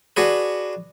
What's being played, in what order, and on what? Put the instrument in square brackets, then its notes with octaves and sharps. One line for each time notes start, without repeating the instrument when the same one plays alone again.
[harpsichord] D4 F#4 G#4 B4